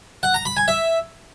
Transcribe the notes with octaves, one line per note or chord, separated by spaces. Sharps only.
F#5
A#5
B5
G#5
E5